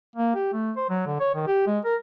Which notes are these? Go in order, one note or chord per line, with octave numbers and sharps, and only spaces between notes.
A#3
G4
A3
C5
F#3
D3
C#5
D#3
G4
G#3
A#4